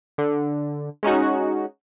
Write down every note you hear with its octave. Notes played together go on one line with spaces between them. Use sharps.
D3
G#3 C#4 D#4 F#4